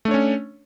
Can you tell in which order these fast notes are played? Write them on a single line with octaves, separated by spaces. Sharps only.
A3 D4 C#5 C#4